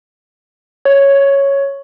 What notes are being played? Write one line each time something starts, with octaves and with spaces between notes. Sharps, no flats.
C#5